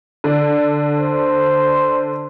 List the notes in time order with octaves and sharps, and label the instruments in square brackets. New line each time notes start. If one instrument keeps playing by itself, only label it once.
[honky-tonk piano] D3 D5
[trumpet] C5